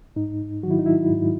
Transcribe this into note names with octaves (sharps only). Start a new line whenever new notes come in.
G#2 D#4
D#3 F#3 E4 F#4
D#4
E4
G#2